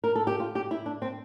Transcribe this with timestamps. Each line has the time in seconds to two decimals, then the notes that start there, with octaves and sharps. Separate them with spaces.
0.04 A#4
0.16 A4
0.27 G4
0.40 F4
0.55 G4
0.71 E4
0.86 D4
1.02 C4